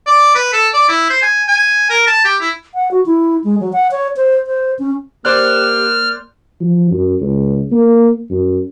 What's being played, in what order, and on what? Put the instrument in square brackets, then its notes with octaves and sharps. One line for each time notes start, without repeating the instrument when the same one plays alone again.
[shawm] D5
B4
A4
D5
E4
C5
G#5
G#5
A#4
A5
G4
E4
[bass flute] F#5
F#4
E4
G#3
F#3
F#5
C#5
C5
C5
C#4
[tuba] A#3 [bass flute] G4 [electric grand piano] C5 D5 F#6 [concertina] F6
[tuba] F3
F#2
C#2
A#3
F#2